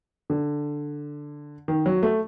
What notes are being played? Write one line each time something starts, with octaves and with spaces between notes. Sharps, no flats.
D3
D#3
F#3
A3